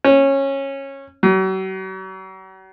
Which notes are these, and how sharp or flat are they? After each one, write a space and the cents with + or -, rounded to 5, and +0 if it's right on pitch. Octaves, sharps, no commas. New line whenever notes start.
C#4 -15
F#3 +40